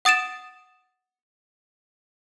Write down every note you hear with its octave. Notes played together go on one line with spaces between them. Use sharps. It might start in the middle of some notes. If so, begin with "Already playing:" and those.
F#5 D#6 A6 D7 E7